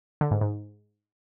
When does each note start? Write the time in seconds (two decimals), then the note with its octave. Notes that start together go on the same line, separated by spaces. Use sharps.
0.21 D3
0.31 G#2
0.41 G#2